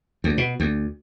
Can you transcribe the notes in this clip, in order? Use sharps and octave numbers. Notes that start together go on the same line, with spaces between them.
D2
B2
D2